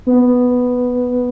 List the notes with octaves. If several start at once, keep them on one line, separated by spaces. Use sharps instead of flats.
B3